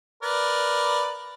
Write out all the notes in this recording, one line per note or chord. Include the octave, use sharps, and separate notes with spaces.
A#4 B4 D5